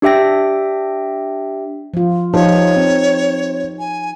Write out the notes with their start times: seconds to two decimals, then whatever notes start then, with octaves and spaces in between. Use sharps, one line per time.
0.02 D4 G4 E5 G5 A#6
1.94 F3 F4
2.34 F3 D#4 G4 B4 C#5
2.76 C4
3.79 G#5